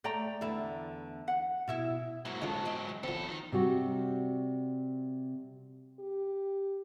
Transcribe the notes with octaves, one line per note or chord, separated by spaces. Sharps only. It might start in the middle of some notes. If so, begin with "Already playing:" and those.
A3 D5 G5 A#5
E2 D3 E4
F#5
B2 E4 E5
G#2 F#3 A#3 E4 F#4
D#3 G#3 C#4 F4 A4
E3 D#5 G5
E2 F3 C4 A4
D#3 D#4
C3 G3 F#4
G4